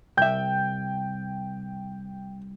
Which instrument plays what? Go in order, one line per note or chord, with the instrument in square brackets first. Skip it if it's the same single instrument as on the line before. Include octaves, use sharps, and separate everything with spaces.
[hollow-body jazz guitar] C2 E5 [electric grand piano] G5 G6